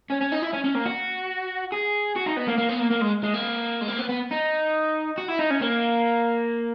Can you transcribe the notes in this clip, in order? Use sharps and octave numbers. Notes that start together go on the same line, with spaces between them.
C#4
C#4
D#4
E4
C#4
C#4
A#3
F#4
G#4
F#4
D#4
B3
A#3
A#3
B3
A#3
A#3
G#3
G#3
A#3
G#3
A#3
B3
B3
D#4
F#4
E4
D#4
C#4
A#3